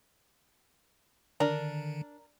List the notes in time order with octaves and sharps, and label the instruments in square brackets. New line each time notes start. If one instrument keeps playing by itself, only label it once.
[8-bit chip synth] D3 D#3 [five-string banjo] D4 [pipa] A#4